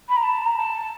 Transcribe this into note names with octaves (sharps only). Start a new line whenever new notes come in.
B5
A#5
A5
A#5
A5